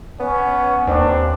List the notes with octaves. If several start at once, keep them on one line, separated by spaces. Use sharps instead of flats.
B3 C#4
D#2 C4 D4